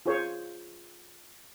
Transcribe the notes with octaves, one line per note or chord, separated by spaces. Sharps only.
F4 G#4 C5 C#5